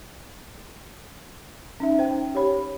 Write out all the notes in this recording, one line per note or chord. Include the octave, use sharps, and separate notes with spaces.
C#4 D#4 E5
C5 G5
G4 C#5 B5